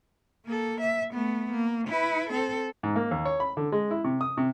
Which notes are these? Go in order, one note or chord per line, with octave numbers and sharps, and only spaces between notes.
A#3 A4
E5
A3 B3
A#3
E4 B4
C4 A4
G#2
A#3
D#2
C#5
B5
D3
G#3
E4
C3
D#6
C3